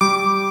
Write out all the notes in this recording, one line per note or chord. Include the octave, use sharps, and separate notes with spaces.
G3 D6